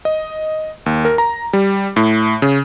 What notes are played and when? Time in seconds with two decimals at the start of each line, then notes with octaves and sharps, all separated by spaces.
0.05 D#5
0.86 D#2
1.05 A#4
1.18 A#5
1.53 G3
1.96 A2
2.42 C#3